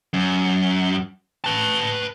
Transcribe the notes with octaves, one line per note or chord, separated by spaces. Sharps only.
F#2
B4 A5